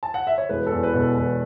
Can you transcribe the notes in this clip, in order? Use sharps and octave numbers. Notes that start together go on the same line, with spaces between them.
A5
F#5
E5
C#5
E1 B4
A4
E2
B4
B2
A4
E1 B4